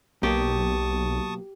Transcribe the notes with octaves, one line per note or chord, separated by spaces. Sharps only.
B1 B2 F#3 A#3 G4 A5 C#6 D#6